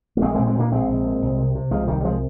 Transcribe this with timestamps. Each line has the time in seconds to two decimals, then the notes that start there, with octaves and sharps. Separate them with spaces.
0.17 A#3
0.22 A#1 G#3 C4
0.30 A#3
0.35 A#2 G#3 C4
0.47 G#3 C4
0.55 A#2 A#3 D4
0.71 A#1 G#3 C4
0.89 A#1
1.05 A#2
1.22 C2
1.39 C3
1.55 C3
1.71 C2 F3 G#3
1.88 C2 D#3 G3
2.01 G3
2.04 C3 F3 G#3